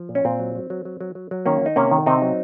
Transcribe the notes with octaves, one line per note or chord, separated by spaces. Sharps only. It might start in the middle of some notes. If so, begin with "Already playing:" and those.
Already playing: F3
A#2
C#4
A#2 C4
F#3
F#3
F#3
F#3
F#3
F#3
F#3
D#3 A#3 C#4
D#3 D#4
C3 A#3 C#4
D#3
C3 C4 D#4
F#3